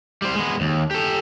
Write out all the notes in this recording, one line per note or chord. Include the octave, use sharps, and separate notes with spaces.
G3 C5
G#3 B3
D#2
G4 A4